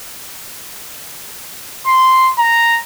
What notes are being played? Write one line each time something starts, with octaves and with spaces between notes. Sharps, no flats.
C6
A#5